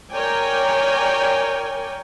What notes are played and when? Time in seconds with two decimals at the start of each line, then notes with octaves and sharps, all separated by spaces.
0.13 A#4 C#5 D5 G5 G#5